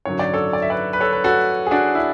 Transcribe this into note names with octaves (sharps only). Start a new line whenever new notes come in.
G#1 F#2 D3 F#3 C#5
D5
A4 C#5
D5
E5
B4 D5
B4
A4 C#5
B4
F#4 A4
G#4
D4 F#4
E4